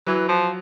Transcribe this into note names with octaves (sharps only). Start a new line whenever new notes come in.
E3 F#3
F3